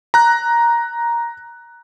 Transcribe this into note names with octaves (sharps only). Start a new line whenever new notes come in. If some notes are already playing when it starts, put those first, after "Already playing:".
A#5 F#6